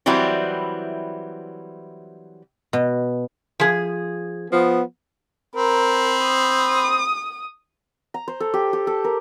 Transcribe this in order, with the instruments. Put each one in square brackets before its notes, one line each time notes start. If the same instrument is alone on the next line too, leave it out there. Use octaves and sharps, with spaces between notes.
[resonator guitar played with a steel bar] E3 F#3 G3 C4 E4
[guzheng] B2
[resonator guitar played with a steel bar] F3 G#4
[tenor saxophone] F3 [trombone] B3
[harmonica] C4 B5 [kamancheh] A#4
[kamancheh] D#6
[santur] A#5
C5
A4
G4
G4
A4
A#4